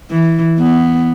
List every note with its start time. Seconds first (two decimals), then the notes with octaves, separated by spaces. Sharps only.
0.11 E3
0.59 B3